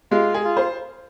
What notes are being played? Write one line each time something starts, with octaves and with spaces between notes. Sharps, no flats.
G#3 F4
G#4
F4
C5